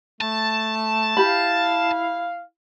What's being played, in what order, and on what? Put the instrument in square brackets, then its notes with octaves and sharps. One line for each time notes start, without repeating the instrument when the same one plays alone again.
[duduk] A3 [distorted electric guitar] A5
[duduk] E4 [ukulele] G4 B5 [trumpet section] F5